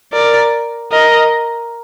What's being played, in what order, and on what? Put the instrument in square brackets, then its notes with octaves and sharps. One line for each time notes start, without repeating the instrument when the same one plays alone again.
[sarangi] A#4 [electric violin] D5
[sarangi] A#4 [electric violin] D#5